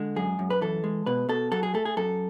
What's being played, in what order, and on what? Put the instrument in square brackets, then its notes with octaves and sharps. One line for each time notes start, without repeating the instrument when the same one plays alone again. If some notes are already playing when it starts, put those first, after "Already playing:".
Already playing: [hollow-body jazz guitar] D3 G#3
F#2 G#4
F#2
B4
E3 A4
G#3
B2 B4
B2 A4
F#3 A4
G#4
A3 A4
G#4
F#2 A4